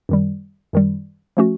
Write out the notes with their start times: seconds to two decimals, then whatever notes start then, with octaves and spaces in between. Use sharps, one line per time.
0.09 F#2 D#3 G3
0.73 F#2 D#3 G3
1.37 F3 A3 C#4 F#4